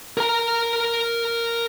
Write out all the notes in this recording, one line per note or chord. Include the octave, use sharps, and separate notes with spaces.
A#4 A#5